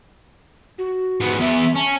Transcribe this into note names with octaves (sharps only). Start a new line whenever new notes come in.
F#4
G#2 B3
E2 B3 E5
C#4 A5